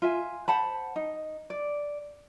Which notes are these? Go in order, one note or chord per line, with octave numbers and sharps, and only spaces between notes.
F4 E5 G#5
C5 F#5 A5 B5
D#4
D5